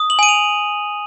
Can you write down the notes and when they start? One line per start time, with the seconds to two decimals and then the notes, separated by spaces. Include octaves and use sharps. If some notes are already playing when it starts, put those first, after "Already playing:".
Already playing: D#6
0.10 F#7
0.19 G#5 D#7
0.29 F7